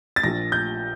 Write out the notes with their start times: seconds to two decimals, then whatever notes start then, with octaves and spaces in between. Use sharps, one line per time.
0.16 A6
0.23 A#1 A#2 F3 A#6
0.52 G6